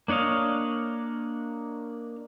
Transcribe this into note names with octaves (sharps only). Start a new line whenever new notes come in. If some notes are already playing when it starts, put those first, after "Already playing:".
A#3 D4 C#5 D#5 F5